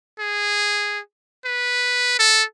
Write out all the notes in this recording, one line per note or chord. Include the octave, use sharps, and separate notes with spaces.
G#4
B4
A4